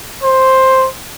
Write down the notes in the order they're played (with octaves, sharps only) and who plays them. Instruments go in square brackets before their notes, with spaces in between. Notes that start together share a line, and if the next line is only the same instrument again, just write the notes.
[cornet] C5